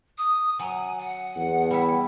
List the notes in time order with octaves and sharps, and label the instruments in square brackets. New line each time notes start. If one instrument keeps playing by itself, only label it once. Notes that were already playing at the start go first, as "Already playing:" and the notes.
[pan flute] D#6
[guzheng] F#3 [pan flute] G#5
[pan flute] F#5
[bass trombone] E2
[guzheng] G3 E4